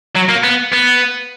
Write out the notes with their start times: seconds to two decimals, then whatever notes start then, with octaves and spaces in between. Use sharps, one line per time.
0.16 F#3
0.29 A#3
0.44 B3
0.73 B3